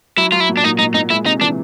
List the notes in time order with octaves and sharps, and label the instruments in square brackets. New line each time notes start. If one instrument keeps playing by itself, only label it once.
[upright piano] F#3 [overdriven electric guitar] E4
[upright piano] F#3 [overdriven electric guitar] F4
[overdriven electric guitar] E4
[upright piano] A#2
[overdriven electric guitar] D4
[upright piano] A#2 [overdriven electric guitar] D#4
[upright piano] A#2 [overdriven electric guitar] D#4
[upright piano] A#2 [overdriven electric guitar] D#4
[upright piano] G#3 [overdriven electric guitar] E4
[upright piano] C3 [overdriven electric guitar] D#4
[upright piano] E3 [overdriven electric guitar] D4